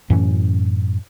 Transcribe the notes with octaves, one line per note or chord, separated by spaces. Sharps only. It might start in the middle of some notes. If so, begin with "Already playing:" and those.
F#2 A2 E3 C#4